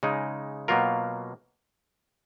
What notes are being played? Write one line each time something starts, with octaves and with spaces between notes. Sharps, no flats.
C#3 G#3 D#4
B2 F#3 A#3 F4 A#4